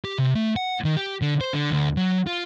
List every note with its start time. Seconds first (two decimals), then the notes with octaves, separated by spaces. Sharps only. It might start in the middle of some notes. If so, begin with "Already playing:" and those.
0.05 G4
0.18 C3
0.35 A3
0.56 F#5
0.85 D#3
0.97 G4
1.22 D3
1.41 C5
1.53 D3
1.71 D2
1.97 F#3
2.27 F4